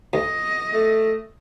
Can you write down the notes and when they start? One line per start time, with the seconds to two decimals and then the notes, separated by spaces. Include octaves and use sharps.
0.14 D2 D#5
0.73 A3